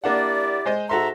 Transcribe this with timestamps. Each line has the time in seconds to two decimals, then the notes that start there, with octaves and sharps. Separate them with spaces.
0.04 A#3 D4 E4 G4 D5 F#5
0.66 G#3 C5 D#5
0.89 G#2 F#4 A4 E5 A#5 C6